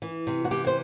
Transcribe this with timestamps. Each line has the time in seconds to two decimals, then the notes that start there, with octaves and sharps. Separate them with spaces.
0.02 E3
0.27 C3
0.45 F#4
0.51 E3 G4
0.67 C5